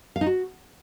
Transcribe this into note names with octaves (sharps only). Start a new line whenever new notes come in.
F5
D#4
F#4